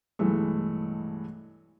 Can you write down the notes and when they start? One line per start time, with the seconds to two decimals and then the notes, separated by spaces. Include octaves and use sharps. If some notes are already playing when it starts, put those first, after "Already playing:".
0.19 B1 G2 E3 G#3 A3